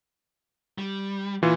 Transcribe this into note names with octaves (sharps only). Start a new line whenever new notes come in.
G3
A#2 E3 F4